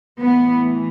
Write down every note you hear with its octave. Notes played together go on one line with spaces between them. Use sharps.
A2 E3 B3